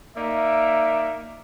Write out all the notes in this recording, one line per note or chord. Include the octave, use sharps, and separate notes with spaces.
A#3 D#4 D5 E5